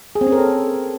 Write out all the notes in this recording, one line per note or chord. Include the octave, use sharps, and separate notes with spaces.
G#4
C4
C#4
A#4
A4